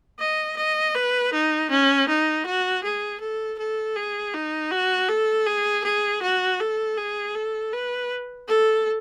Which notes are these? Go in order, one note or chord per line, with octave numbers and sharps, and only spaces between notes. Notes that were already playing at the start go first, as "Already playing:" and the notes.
D#5
D#5
B4
D#4
C#4
D#4
F#4
G#4
A4
A4
G#4
D#4
F#4
A4
G#4
G#4
F#4
A4
G#4
A4
B4
A4